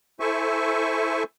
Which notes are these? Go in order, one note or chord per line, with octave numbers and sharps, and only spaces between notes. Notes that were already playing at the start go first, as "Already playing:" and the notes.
E4 A4 C5 E5 G#5 C#6